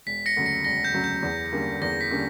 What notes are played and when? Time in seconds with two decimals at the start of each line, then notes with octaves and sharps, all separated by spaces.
0.06 E1 B6
0.26 A#6 C#7
0.37 D2 C#3 F#3
0.46 A#6 C#7
0.64 E1 A#6
0.84 G6
0.94 D2 C#3 F#3
1.04 G6
1.23 E2
1.52 D3 G3 A#3 C#4
1.82 E2 A#6
2.01 B6
2.11 D3 G3 A#3 C#4